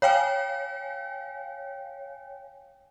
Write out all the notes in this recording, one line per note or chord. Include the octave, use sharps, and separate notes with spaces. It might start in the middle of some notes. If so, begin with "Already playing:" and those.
C#5 F5 G5 G#5